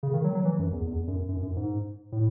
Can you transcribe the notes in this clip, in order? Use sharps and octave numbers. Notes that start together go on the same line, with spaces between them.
C#3
D#3
F#3
F#3
E3
F#2
E2
E2
F#2
F#2
F#2
G#2
A2